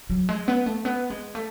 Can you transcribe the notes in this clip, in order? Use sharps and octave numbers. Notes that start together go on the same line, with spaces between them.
F#3
G#3
B3
A3
B3
G#3
A3